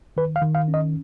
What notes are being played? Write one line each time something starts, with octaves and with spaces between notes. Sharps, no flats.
D#3 B4
F5
D#3
F5
C#4
D#5